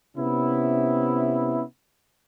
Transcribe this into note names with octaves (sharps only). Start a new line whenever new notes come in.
C3 B3 C#4 E4